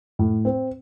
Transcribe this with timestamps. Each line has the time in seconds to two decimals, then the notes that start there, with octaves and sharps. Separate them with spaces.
0.19 A2
0.45 C4